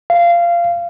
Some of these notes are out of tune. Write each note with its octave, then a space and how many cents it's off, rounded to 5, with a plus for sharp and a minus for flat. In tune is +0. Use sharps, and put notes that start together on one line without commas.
F5 -20